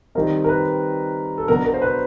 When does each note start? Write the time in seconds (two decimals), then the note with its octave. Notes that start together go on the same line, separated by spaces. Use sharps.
0.15 D#3 G3 C4 D#4 A#4
0.44 A#4
0.49 B4
1.38 A4
1.48 B2 F#3 B3 D4 A#4
1.65 A#4
1.74 C5
1.82 B4